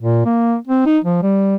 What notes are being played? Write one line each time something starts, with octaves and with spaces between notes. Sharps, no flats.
A#2
A#3
C4
D#4
F3
G3